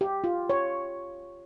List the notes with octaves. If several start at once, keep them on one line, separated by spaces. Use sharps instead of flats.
G4
F4
C#5